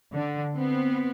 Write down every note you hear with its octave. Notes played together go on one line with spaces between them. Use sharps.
D3
B3 C4